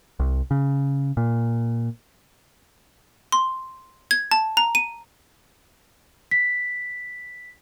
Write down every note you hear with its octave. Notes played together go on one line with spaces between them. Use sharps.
C2
C#3
A#2
C6
G#6
A5
A#5
D#7
B6